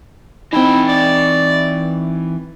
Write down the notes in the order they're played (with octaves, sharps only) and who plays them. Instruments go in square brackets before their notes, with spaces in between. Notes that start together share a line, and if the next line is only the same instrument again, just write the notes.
[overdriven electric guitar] E3 G5 [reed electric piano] C4 D#4 [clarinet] E4
[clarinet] D5